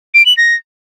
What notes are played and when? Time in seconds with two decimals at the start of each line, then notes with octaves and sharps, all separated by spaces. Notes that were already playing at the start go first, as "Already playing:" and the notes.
0.14 D7
0.26 F#7
0.37 A#6